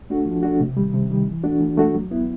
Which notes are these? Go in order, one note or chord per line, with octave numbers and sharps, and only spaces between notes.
A3 D4 F#4
F3
A3 D4 F#4
C3
D#3 G3
C3
D#3 G3
E3
A3 D4 F#4
E3
A3 D4 F#4
F#3
B3 E4